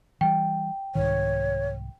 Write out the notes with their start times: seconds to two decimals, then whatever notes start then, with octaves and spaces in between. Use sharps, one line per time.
0.21 E3 G3 G5
0.95 C2 G#2 D#3 C#5